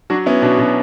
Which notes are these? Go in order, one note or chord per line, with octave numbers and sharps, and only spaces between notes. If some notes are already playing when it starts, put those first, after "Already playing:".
F#3 D4 F#4
B3 C#4 E4
B2 D4
B2 C#4